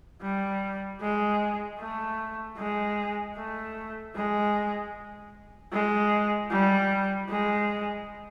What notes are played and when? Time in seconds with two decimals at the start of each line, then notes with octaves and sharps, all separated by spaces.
0.22 G3
1.01 G#3
1.80 A3
2.57 G#3
3.36 A3
4.15 G#3
5.72 G#3
6.51 G3
7.29 G#3